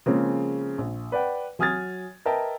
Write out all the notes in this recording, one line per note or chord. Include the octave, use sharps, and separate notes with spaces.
C#3 F3 G#3 A#3 C4 C#4
A#1
B4 D5 F#5 G5
F#3 G#5 D#6 F6 G#6 A6
A#4 B4 D#5 E5 G5 A5